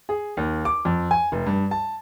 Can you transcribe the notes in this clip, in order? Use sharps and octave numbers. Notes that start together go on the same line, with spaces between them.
G#4
D#2
D6
F2
G#5
F1
G2
A5